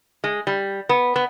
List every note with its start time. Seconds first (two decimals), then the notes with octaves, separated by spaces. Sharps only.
0.24 G#3
0.47 G3
0.89 B3
1.16 B3